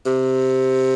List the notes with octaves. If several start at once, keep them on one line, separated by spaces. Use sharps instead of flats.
C3